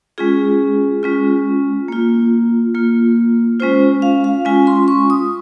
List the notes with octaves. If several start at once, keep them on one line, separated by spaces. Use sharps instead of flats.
G#3 C#4 F4 G#4
G#3 C#4 F4
A#3 F4
A#3 F4
G#3 C#4 F4 C5
F5
F5
G#3 C#4 F4 G#5
C6
C#6
D#6